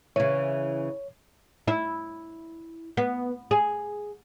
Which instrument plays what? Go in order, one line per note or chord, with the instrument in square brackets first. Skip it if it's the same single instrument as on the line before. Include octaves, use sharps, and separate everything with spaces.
[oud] C#3 E3 [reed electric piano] C#5
[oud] E4
B3
G#4